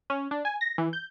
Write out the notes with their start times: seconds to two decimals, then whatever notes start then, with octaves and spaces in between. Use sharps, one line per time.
0.10 C#4
0.31 D4
0.45 G#5
0.61 A#6
0.78 E3
0.93 G6